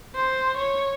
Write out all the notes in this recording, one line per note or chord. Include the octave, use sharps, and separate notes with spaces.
C5
C#5